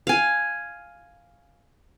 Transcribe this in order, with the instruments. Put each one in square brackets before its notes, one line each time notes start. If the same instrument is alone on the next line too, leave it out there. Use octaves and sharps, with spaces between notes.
[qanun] F5 G#5